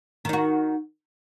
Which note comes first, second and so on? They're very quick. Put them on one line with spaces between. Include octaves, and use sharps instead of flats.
D#3 D#4 F#4